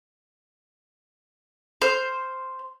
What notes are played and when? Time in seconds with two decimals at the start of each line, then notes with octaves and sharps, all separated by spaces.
1.82 C5 F6